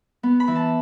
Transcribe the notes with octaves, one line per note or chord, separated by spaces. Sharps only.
B3
B5
E3
A5